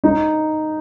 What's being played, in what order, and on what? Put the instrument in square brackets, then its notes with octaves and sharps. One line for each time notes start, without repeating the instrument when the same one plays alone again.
[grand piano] D#4